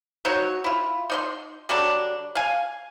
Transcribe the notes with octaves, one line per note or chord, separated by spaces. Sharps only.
F#3 D#4 F#4 C#5
E4 F4
D#4 D5 C6
D3 F#3 G3 D4
F5 G#5